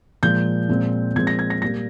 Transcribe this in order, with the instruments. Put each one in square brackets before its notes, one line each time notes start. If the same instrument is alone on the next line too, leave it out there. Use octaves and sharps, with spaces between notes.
[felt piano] A#2 F3 G#3 G6
A#2 F3 G#3 C4
A#2 F3 G#3 C4 G#6
A#6
G#6
A#6
A#2 G3 A#3 A#6